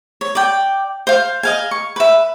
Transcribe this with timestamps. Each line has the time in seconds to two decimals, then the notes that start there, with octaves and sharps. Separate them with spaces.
0.21 C#5
0.35 D5 G5
1.07 C5 F5
1.43 D#5 F5 G#5
1.71 C#6
1.96 B4 E5